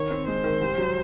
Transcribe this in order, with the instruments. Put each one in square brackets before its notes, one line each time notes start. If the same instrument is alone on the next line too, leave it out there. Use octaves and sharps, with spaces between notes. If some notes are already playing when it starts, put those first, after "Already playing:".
Already playing: [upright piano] D#3 [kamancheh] C#5
[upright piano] C4
[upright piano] G#3 [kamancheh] C5
[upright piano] D#3
C2
F#3